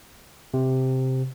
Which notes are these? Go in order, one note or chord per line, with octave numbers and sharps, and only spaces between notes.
C3